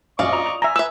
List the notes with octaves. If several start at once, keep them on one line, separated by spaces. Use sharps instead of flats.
A#1 F#2 D5 D#5 F5 C#6 D6
A#5 D#6 F7
F7
E5 G#5 A#5
B4 E5 E6